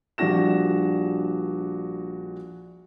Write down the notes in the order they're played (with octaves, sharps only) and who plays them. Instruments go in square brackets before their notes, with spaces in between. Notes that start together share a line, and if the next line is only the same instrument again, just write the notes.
[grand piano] A#1 G3 D4 F#4 A#6 E7